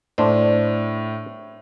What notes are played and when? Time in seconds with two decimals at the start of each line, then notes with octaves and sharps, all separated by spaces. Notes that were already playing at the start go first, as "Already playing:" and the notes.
0.18 A2 D4 C5